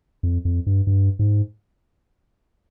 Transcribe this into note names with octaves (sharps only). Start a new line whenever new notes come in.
F2
F2
G2
G2
G#2